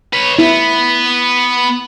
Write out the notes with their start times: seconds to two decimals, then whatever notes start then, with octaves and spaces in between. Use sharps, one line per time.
0.13 B4 C#5
0.39 B3 E4